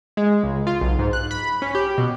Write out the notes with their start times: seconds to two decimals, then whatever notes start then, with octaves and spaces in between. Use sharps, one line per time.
0.17 G#3
0.44 C#2
0.67 F4
0.81 B1
0.99 G#2
1.13 F#6
1.31 B5
1.62 C#4
1.75 G4
1.98 B2